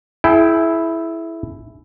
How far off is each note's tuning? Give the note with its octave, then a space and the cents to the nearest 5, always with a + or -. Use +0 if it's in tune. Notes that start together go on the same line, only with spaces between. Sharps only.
E4 +0 G#4 +40 G5 +0